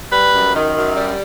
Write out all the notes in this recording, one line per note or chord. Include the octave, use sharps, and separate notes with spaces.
G3 B4
F#2
D#3
F#2
G3